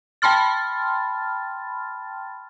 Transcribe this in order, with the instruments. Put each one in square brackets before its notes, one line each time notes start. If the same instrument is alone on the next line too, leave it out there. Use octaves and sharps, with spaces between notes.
[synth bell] G5 A5 B5 C6 F6 A6